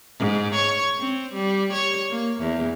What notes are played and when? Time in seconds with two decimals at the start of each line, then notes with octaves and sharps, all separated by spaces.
0.19 G#2
0.55 C#5
0.99 C4
1.34 G3
1.73 C#5
2.11 A#3
2.41 E2